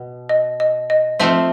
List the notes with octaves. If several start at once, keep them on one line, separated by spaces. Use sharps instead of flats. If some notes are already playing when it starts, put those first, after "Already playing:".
Already playing: B2
D#5
D#5
D#5
F3 A3 C4 E5